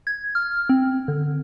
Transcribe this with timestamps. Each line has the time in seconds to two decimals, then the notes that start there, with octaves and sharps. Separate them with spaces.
0.07 G#6
0.35 F6
0.69 C4
1.08 D3